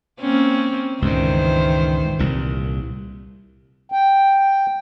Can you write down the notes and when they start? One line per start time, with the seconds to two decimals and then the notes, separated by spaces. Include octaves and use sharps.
0.20 A#3 C4 C#4
1.02 C#2 G2 A#2 D#3 E3 C5
2.19 C2 A#2
3.92 G5